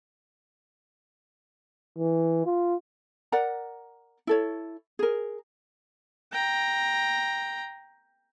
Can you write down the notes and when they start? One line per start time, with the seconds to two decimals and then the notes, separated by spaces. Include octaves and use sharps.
1.98 E3
2.46 F4
3.32 A#4 D5 F#5 A#5
4.27 E4 A4 C#5
4.99 G#4 A#4
6.33 G5 A#5